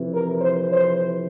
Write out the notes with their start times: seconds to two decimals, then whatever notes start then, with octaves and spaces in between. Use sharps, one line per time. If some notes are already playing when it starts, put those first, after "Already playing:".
Already playing: F2 C3 E3
0.12 A#4
0.42 C5
0.72 C5